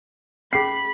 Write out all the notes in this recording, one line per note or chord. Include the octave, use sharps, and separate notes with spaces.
C#4 G#4 B5 C7